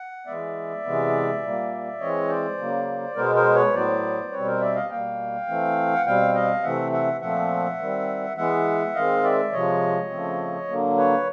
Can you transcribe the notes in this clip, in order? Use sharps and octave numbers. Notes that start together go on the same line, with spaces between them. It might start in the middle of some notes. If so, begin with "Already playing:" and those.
Already playing: F#5
E3 G#3 B3 D5 E5
C3 E3 G#3 B3
A#2 G3 A#3
E3 G#3 C4 C#5 D#5
C5 D5
C#3 F#3 A#3
B2 G#3 B3 A#4 C5
A#4 C5
B4 C#5
A2 F#3 B3 C5 D5
B2 G3 C4 B4 C#5
A#4 C5
D5 E5
D#5 F5
B2 G3 A#3 F5 G5
E3 A3 C4
F#5
B2 G3 C4 F5 G5
D#5 F5
C3 E3 A3 C4 E5 F#5
E5 F#5
A#2 F3 A3 C4 E5 F#5
D#3 G3 C4
E3 G#3 B3 E5 F#5
D#3 G#3 C4 D#5 F5
D5 E5
C3 F3 G#3 C#5 D#5
C#3 F3 A3 C4
D3 F#3 A#3
B4 C#5